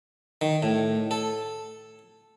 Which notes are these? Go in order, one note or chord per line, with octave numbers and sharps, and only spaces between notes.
D#3
A2
A4